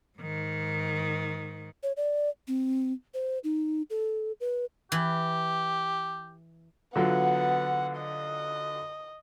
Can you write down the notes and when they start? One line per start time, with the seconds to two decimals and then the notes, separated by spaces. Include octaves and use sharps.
0.19 G#2 D#3
1.83 C#5
1.97 D5
2.48 C4
3.14 C5
3.44 D#4
3.90 A4
4.40 B4
4.92 E3 G4
6.96 D3 F#3 B3 F4 F#5
7.98 D#5